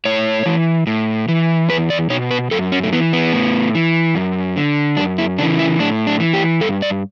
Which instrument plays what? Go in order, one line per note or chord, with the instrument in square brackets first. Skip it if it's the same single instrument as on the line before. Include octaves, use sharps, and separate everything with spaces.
[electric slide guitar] A2 C#5
E3
A2
E3
E2 B4
D5
B2 C#5
B4
F#2 A4
C#4
A3
E3 B3
B3
A2
E3
F#2
D3
F#2 D4
E4
C#3 D4
E3
E4
A2 D4
D4
E3
G4
G2 A4
D5